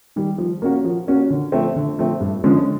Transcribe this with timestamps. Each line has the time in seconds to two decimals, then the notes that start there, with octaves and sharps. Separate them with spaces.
0.16 D#3 G3
0.38 F3
0.62 A#3 C#4 F#4
0.84 F3
1.07 A#3 C#4 F#4
1.30 D3
1.52 F3 A3 C4
1.76 D3
1.99 F3 A3 C4
2.20 G2
2.44 D3 F3 G#3 C#4